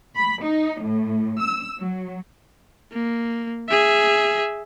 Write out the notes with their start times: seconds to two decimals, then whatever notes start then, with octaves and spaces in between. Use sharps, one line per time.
0.15 B5
0.44 D#4
0.82 A2
1.42 E6
1.80 F#3
2.93 A#3
3.69 G#4 E5